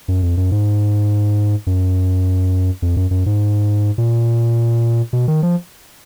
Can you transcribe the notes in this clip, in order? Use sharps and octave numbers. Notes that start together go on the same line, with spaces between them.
F#2
F2
F#2
G#2
F#2
F2
F#2
F#2
G#2
A#2
B2
D#3
F3